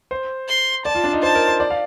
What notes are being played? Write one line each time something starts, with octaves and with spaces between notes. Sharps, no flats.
C5
C6
D5 A5
F4
D4
D#4
C5 A5
A#4
C5
D5
F5